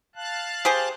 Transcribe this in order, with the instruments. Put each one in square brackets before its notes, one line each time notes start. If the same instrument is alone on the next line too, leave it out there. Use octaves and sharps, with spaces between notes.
[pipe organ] F5 A5 F#6
[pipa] G4 G#4 C5